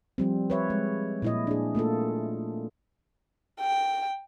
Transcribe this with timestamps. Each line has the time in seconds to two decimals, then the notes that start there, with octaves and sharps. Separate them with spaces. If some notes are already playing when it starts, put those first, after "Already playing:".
0.18 F3 G3 C4
0.50 B4 C#5 E5
0.70 G#3
1.22 A#2 E4 D#5
1.47 D4 G#4
1.75 A3 A#3 F4 A4
3.60 G5